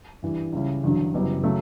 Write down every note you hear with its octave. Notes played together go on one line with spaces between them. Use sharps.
G2 E3 G3
C#2 C#3 G3 C#4 E4
A1 G2 D3 F#3
F#1 F#2 E3 G3 B3
C#3 F#3 A3